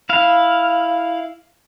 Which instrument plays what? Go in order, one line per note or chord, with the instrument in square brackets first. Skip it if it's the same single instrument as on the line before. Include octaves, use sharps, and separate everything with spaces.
[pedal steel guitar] E4 F5